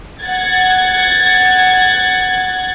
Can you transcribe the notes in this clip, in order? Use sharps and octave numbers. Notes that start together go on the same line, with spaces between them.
F#5 G#6 A6